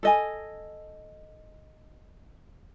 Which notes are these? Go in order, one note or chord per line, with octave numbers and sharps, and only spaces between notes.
A4 D#5 G#5